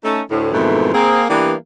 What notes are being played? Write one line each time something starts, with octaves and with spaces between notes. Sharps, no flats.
A3 C#4 D#4 A4
D2 A2
F2 G#2 B2 D#3 E3 A3
A#3 C4 G#4
E3 G3 A#3 B3 D4 G4